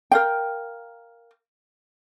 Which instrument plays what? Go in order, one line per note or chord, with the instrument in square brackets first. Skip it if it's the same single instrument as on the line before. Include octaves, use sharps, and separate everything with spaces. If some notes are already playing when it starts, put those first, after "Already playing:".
[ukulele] A#4 F5 G5